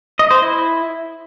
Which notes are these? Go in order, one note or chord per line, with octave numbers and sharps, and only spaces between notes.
D#5
C5
E4